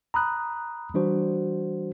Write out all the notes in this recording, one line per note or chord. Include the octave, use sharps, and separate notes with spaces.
A#5 B5 D#6 F#6
E3 G3 D4 F#4 C5